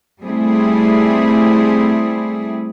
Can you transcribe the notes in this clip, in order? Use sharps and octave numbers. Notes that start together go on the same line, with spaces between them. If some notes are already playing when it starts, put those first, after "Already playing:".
G3 A3 C4 E4 G#4